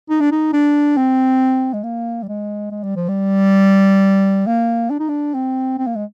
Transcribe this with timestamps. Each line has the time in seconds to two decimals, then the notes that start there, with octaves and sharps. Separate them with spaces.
0.09 D#4
0.20 D4
0.31 D#4
0.53 D4
0.97 C4
1.73 G#3
1.84 A#3
2.23 G3
2.28 G#3
2.71 G#3
2.83 G3
2.96 F3
3.08 G3
4.47 A#3
4.90 D4
4.99 D#4
5.09 D4
5.34 C4
5.78 C4
5.87 A#3
5.96 G#3